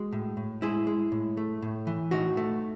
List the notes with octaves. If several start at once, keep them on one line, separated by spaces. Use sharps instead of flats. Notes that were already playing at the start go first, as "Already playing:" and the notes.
Already playing: G#3 F#4
A2
A2
G#3 E4 G#4
G#3
A2
A3
A2
E3
A2 D#4 F#4
A3